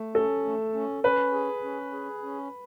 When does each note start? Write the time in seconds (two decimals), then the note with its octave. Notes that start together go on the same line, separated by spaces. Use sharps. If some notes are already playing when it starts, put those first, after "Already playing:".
Already playing: A3
0.15 C#4 A4
0.45 A3
0.74 C#4
1.04 C#4 B4
1.33 G#4
1.63 C#4
1.93 G#4
2.23 C#4